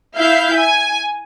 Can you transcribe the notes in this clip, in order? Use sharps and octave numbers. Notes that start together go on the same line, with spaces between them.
E4 E5 F5 G6
G#5